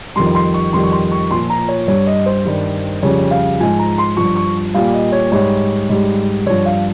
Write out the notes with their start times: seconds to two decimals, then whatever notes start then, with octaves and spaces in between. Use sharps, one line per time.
0.16 F2 D#3 G3 C6
0.35 C6
0.54 C#6
0.73 F2 D#3 G3 C6
0.83 C#6
0.92 C6
1.11 C#6
1.31 A#2 F3 C6
1.50 A#5
1.68 C#5
1.88 G2 G3 C#5
2.07 D#5
2.26 C5
2.45 G2 D#3 G3
3.02 F2 C#3 G3 C#5
3.31 F5
3.60 G#2 F3 G#5
3.79 A#5
3.98 C6
4.17 G2 F3 C#6
4.36 C#6
4.74 A#2 G3 F5
4.94 D#5
5.12 C#5
5.32 G#2 G3 C#5
5.89 G#2 G3
6.46 G2 F3 C#5
6.66 F5